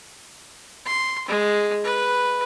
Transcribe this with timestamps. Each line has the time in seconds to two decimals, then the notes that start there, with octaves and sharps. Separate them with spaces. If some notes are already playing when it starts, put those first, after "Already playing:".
0.85 C6
1.28 G#3
1.84 B4